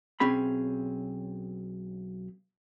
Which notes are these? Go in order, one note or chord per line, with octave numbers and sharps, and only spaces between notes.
B1 C4 C#4 G#4 B5